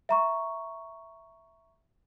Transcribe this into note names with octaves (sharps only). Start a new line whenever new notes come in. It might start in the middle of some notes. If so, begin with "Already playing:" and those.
E5 A#5 C#6